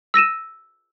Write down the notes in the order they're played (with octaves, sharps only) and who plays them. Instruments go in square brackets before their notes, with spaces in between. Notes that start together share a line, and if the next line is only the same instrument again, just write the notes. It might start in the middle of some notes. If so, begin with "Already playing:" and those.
[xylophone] E6 A#6 D#7 E7